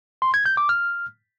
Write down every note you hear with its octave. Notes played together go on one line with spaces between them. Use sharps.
C6
G#6
G6
D6
F6